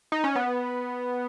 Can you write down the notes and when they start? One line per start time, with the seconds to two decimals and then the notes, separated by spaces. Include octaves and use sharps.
0.12 D#4
0.24 C#4
0.36 B3